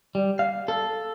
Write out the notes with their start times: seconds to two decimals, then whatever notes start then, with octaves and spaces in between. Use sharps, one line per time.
0.15 G3
0.39 F5
0.68 A4